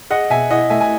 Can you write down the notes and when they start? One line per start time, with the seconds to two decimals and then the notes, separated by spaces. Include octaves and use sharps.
0.10 G#4 D#5 F#5
0.30 B2 E5 G#5
0.50 E4 D#5 F#5
0.70 A3 E5 G#5
0.81 G#5